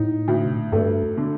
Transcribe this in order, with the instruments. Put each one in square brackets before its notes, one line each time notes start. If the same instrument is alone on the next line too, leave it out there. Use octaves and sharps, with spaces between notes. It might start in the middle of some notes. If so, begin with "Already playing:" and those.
Already playing: [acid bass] A2 [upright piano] D#4
[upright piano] D2
[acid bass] C3
A#2
A2
[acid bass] G2 [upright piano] A3
[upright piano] D3